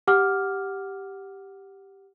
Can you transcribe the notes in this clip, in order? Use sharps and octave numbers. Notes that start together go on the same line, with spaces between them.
G4 F#5 D6 F6